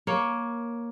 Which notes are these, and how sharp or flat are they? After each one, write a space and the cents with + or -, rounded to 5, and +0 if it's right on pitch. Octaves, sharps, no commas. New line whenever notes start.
A#3 +10 C#5 +0